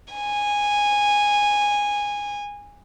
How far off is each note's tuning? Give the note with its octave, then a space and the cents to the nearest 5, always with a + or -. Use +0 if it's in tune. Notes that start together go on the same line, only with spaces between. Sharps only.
G#5 -15